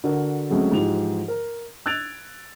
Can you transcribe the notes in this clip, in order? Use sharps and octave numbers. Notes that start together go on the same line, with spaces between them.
D3 F#4 A#4
F#3 G#3 A3 C4 C#4
G#2 E3 F3 G4 F7
A#4
E6 F#6 G#6 A6 D7 F7